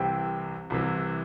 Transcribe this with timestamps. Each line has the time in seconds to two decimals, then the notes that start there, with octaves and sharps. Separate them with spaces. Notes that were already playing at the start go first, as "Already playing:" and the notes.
Already playing: C2 C3 E3 G5
0.70 C2 C3 E3